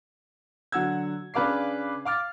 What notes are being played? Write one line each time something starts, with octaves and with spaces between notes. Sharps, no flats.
D3 F#3 F#5 E6 G#6
C#3 D4 B4 F5 D6 C7
F5 D6 F6 A6